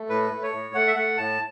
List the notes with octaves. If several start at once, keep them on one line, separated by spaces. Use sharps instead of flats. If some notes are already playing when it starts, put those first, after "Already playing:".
Already playing: A3
A2 B4
A3
C#5
A2
A3 F#5
E5
A3 F#5
A2 A5